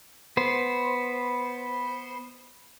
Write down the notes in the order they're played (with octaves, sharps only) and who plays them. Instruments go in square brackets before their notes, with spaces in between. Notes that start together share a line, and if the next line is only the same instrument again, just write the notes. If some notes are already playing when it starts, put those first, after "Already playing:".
[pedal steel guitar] B3 C5